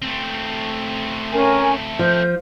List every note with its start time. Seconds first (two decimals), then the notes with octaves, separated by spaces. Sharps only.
0.02 A3 C4
1.32 C#4 A#4 G#5
1.99 F3 G6